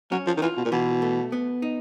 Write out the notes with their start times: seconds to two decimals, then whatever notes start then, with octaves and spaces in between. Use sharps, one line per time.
0.12 F#3 C#4
0.27 F3
0.37 D#3
0.42 E3 F4
0.58 B2
0.65 A#2
0.72 B2 E3
1.02 A3
1.32 B3
1.62 D#4